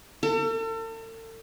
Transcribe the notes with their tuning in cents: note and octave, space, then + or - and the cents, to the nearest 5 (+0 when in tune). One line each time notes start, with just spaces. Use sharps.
A4 +40